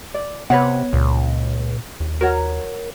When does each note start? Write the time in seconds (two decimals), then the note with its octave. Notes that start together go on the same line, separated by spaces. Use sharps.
0.14 D5
0.50 C3 B3 B4 C#5 F#5
0.93 C#2 A#2
2.00 D#2
2.21 F#4 A#4 C#5 F#5